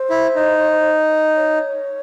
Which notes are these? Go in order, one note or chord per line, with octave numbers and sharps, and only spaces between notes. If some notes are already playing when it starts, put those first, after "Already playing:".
Already playing: C5
E4
D#4
C#5